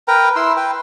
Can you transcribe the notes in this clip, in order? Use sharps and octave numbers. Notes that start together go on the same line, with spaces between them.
A#4 B4 G5 A#5
E4 C6 E6
B4 G5